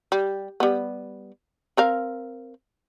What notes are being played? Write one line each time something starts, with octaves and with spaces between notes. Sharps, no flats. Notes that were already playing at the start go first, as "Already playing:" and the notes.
G3
G3 B3
C4 A#4 F5